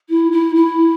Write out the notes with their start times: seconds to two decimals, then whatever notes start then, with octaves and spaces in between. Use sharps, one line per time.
0.09 E4
0.32 E4
0.55 E4